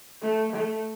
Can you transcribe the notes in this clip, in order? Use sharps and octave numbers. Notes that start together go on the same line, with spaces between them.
A3
A3